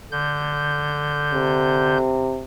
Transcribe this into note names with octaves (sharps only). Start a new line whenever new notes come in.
D3 G6
C3